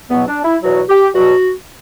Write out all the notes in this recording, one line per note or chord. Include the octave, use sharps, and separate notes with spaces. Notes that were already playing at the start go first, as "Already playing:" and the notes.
E2 B2 F#3 B3
D4
E4
E2 B2 F#3 F#4
G4
E2 B2 F#3 F#4